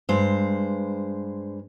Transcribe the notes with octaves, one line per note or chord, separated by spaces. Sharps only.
G2 G#3 C5